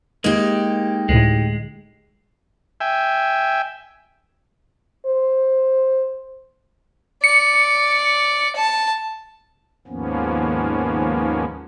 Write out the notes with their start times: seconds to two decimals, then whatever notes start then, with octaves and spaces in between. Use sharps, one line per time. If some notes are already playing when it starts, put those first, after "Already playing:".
0.24 G#3 A#3 D#4 G4
1.09 D2 A2 G#3
2.80 E5 G5 G#5
5.06 C5
7.24 D5 C#7
8.56 A5
9.87 D#2 G#2 F3 A#3 B3 C#4